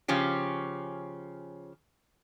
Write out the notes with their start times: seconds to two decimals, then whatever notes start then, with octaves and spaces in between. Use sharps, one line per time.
0.08 C#3 F3 C#4 G4